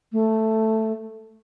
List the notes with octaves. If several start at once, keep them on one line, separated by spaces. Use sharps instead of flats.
A3